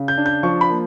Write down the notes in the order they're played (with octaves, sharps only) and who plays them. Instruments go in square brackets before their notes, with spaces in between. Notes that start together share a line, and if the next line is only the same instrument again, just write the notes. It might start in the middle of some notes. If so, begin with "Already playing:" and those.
Already playing: [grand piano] C#3
G6
D4
G6
F3 C#6
B5
A#3